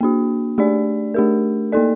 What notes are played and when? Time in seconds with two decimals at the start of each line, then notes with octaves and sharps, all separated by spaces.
0.01 A#3 D4 F#4
0.58 A3 D4 G4 D5
1.14 A3 D4 G4 A#4
1.72 A#3 D#4 A4 D5